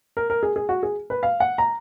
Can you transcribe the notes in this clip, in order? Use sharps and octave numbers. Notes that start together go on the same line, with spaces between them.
A#4
A#4
G#4
G#4
F#4
G#4
B4
F5
F#5
A#5